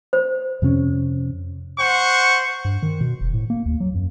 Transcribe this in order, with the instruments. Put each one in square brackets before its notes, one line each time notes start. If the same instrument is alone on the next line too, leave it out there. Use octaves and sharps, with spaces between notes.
[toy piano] C5
[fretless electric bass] F2 C3 C4 C#4
[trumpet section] C5 F#5 C#6
[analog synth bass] G2
D#3
B2
F1
A2
A#3
D#2
F#3
F#2